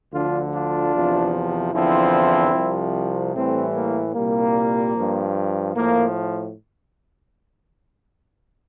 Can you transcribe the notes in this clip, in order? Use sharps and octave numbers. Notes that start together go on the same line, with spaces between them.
D2 D3 F3 D4 F4
D4 F4
E2 C3 F3
E2 D3 F3 C4 E4
C2 C3 F3
A2 E3 G3 A3 C4
A#3
C2 A#2 G3 A#3
G2 F3
A2 F3 A#3